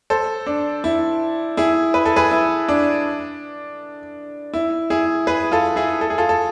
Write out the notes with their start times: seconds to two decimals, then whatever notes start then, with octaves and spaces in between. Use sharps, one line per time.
0.10 A4 C5
0.47 D4
0.84 E4
1.57 E4 G#4
1.94 B4
2.05 A4
2.16 G#4 B4
2.31 E4
2.69 D4
4.54 E4
4.90 E4 G#4
5.27 G#4 B4
5.52 F4 A4
5.76 E4 G#4
6.01 A4
6.10 G#4
6.18 F4 A4
6.29 A4